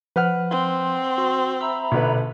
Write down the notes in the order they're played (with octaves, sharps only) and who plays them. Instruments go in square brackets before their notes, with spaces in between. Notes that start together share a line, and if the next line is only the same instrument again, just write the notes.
[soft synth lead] F3 [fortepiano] B4 F#5 F6
[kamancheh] C4 [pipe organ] C6
[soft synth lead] F#4
[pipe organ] E5 A#5 B5 [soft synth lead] E6
[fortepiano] A#1 D3 B4 [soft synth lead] B2